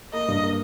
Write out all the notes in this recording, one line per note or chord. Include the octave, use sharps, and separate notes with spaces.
A#3 D#5
G2
A#3